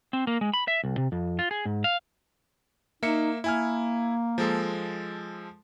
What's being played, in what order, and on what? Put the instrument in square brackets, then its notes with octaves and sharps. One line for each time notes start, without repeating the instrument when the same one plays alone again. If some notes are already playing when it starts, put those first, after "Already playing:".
[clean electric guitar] C4
A#3
G#3
B5
E5
C2
C3
F2
F4
G#4
G#2
F5
[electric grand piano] A#3 E5 C#7 [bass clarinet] D#4
[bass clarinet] A#3 [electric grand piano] E4 G#5 F6
[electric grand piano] F3 G#3 A4